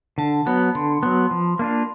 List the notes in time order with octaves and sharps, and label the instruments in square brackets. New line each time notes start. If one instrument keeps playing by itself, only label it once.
[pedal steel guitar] D3 [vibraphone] A5
[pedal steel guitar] F#3 B3 [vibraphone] B5
[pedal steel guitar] D3 [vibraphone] C6
[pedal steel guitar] F#3 B3 [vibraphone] C6
[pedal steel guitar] F3
A#3 D4 F4